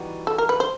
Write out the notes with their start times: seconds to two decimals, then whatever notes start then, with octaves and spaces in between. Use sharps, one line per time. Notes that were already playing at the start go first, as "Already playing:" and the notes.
Already playing: E3 G3 B3 D#4 F#4
0.27 A4
0.38 A#4
0.49 B4
0.60 C5